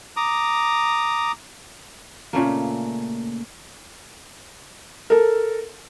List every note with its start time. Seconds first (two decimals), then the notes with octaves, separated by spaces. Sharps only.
0.16 A#5 D6 D#6
2.33 A#2 C#3 A3 A#3
5.10 A4 A#4